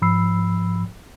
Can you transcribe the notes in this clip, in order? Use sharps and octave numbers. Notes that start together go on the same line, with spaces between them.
G#2 F3 B5 E6 C7